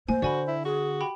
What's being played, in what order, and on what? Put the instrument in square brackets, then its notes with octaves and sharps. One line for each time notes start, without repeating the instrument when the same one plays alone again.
[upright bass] A#3 [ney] C5 [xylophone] G#5
[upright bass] D3 [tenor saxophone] F#4 [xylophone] D5 G#5 B5
[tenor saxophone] E4
[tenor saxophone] F#4 [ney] G#4
[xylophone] G4 G5 B5